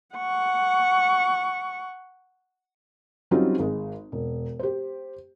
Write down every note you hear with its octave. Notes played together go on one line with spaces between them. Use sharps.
F#5 C#6
F#3 G3 C4 C#4 D#4 F4
G#1 G#3
E1
G4 C5